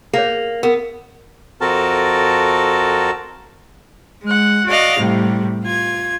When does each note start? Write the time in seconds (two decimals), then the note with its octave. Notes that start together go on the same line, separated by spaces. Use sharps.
0.13 A#3 G#4 C#5
0.63 B3 A#4
1.61 F2 C4 F#4 A4 A#4 A5
4.23 G#3 F#5
4.67 F#4 D5 D#5 F5
4.99 A2 C3 G3
5.63 F4 G#6